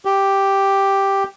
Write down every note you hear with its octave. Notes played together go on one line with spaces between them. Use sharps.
G4